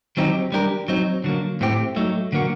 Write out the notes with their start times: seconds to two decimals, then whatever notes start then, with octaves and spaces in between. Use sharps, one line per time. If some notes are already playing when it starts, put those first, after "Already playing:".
0.17 D#3 F#3 C4 D#4 G4
0.52 G3 D4 G4 A#4
0.88 F#3 C4 D#4
1.24 D3 F#3 A#3
1.61 A2 A3 C4 G4
1.96 F#3 A3 D#4
2.32 D3 F#3 A#3 F#4